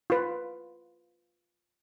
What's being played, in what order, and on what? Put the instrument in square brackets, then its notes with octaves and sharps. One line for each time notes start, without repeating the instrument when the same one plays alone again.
[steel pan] F4 B4